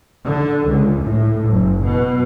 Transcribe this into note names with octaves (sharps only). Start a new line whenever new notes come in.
D3
C#2
A2
F#1
B2